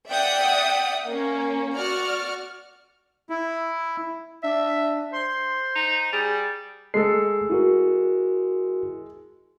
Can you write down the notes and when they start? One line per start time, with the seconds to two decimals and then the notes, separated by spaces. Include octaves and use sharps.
0.11 D5 E5 F#5 G5 D#6
1.07 A#3 C#4
1.74 F#4 D5 F6
3.30 E4
4.43 D4 E5
5.13 C5 C6
5.76 D#4
6.12 G3 G#4
6.94 G#3 A3 A4 C7
7.50 E4 F#4 A#4